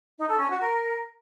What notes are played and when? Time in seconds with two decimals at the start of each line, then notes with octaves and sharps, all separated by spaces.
0.18 D#4
0.28 A4
0.39 C#4
0.50 F#4
0.60 A#4